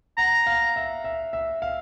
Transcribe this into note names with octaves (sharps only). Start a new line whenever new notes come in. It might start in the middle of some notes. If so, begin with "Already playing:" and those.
F#5 A#5
F5
E5
E5
E5
F5